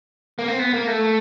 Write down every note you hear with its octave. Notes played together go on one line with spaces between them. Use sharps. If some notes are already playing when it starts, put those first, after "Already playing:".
A#3
C4
B3
A#3
A3